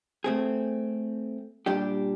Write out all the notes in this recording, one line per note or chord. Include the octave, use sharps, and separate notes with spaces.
A3 C4 G#4
A#2 G3 D4 G4